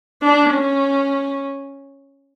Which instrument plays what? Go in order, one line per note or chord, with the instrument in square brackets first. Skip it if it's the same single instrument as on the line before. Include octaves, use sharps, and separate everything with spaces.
[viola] D4
C#4